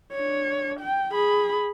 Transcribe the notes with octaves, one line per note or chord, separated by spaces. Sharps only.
D4 C#5
G5
G#4 B5